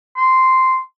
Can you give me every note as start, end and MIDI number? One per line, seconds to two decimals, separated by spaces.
0.17 0.78 84